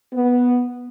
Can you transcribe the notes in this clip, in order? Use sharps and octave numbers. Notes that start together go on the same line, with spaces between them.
B3